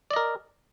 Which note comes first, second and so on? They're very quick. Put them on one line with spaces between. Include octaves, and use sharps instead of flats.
D5 D#5 A#4